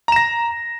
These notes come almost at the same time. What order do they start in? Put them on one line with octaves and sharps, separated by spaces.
A#5 E7 A#6